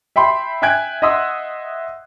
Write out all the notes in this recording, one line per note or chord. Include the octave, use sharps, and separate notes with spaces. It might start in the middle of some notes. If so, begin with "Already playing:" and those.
E5 G5 B5 C6
E5 G5 G#5 F#6 G#6 D7
D#5 E5 F#5 C6 D#6 E6